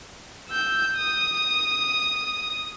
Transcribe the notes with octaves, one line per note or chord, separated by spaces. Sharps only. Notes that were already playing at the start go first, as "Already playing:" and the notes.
E6 G6
D#6